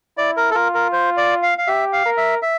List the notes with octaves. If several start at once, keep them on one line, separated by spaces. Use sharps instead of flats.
E4 D5
A#4
A4
F4 A#4
A#4
C5
D5
F5
F5
G4 E5
F5
A#4
E5
E5